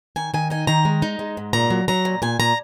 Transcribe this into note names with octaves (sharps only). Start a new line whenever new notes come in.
D#3 G#5
D#3 G#5
D#4 G#5
D#3 A#5
G#3
D#4
G#3
G#2
A#2 A#5
F#3
F#3 A#5
A#2
A#2 G#5
A#2 A#5